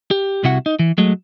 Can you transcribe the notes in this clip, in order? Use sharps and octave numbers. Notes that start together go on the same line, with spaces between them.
G4
C2 C3 E4 F#4 F#5
D#4
E3
F#3 G#3 A3